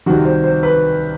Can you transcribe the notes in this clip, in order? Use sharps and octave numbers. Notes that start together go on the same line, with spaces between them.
C2 C3 D#3 F#4
C5
C5
B4